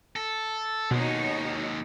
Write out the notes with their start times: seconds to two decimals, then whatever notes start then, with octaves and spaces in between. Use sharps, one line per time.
0.16 A4
0.91 D#2 B2 G#3 D#4 F#4 C#5